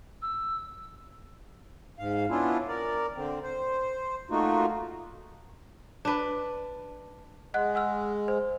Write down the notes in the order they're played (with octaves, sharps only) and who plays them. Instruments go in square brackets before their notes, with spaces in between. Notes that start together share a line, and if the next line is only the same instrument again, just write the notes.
[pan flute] E6
[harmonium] G#2 F5
B3 C#4 D4 E4 F4
A#4 D5
D3 C4
C5
A3 A#3 D#4 F4 F#4
[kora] D4 B4
[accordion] G#3 [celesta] D#5 F#5 F#6
[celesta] F#5 E6 F6
C5